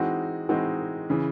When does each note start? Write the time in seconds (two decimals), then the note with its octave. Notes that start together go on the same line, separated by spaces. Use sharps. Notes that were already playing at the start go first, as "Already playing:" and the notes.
Already playing: E3 G#3 C4 D#4 F#4
0.49 E3 G#3 C4 D#4 F#4
1.10 C#3 E3